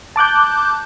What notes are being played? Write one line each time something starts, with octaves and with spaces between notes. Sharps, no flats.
A5 D6 F#6 G6